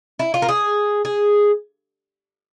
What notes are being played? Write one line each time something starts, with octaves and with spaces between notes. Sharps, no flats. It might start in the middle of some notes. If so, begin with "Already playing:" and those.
E4
F4
A#4
G#4
G#4